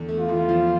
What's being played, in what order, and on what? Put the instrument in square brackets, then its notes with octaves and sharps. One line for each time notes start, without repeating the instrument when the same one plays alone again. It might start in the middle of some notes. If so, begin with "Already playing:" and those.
Already playing: [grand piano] E2 D3
A3
[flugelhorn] F4
[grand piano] E2
F3